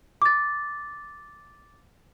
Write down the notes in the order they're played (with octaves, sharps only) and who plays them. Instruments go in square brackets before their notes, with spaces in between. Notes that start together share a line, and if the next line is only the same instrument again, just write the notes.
[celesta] D6 A6